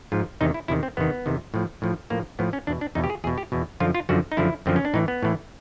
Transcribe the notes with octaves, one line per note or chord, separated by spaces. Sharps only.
G#2 F3 F4
E2 C3 D#3 D#4
E4
E2 C3 D#3 E4
C4
E2 C3 D#3 B3
E2 C3 D#3
A2 F3
A2 F3
A2 F3 A#3
A2 F3 B3
C#4
E2 B2 D4
D4
E2 B2 D#4
G4
G#4
E2 B2 G#4
G4
E2 B2
F#2 D3 F3 F4
F4
F#2 D3 F3 F#4
D#4
F#2 D3 F3 E4
F#2 D3 F3 C4
C#4
D4
A2 E3 D#4
B3
A2 E3